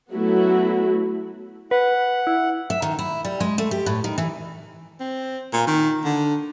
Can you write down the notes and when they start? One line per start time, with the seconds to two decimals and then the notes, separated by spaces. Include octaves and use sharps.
0.12 F#3 A3 B3 E4 F#4
1.71 B4 F#5
2.27 E4
2.70 E5
2.82 D#3
2.99 E4
3.25 G3
3.40 G#3
3.58 A3
3.71 G4
3.86 A2
4.04 D#3
4.18 E3
5.00 C4
5.53 A#2
5.67 D#3
6.04 D3